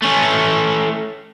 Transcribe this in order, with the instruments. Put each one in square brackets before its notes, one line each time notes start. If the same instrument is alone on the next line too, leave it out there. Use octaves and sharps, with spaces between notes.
[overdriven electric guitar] A3 C#4